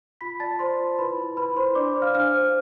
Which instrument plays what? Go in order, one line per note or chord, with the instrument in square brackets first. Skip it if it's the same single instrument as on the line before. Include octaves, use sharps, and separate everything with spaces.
[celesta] F4 B5 B6
D5 A5 A6
C5 D5 C6
F4
E4 B4 B5
E4
E4 B4 B5
E4 C5 C6
D4 D5 D6
C5
F5 F6
D4 F5 F6
C5